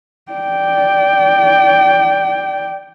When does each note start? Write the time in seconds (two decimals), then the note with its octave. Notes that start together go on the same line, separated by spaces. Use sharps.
0.32 D5 G5